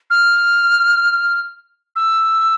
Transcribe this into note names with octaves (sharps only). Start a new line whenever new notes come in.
F6
E6